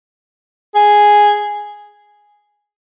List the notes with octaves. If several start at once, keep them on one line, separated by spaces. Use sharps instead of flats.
G#4